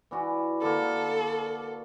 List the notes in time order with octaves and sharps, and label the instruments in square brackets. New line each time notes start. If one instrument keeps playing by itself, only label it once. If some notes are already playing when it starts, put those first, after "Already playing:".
[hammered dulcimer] E3 D4 F#4
[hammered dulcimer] D3 A#3 [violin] A4